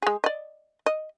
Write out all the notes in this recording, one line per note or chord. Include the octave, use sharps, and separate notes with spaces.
G#3 G#4
D5 D#5
D#5